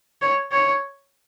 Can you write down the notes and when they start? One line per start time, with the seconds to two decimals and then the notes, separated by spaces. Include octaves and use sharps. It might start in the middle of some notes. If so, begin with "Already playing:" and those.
0.22 C#5
0.52 C#5